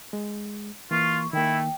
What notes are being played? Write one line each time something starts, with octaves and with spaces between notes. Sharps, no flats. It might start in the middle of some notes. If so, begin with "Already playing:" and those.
G#3
E3 A#3 F4 C#6
D#3 A3 A#3 E4 G5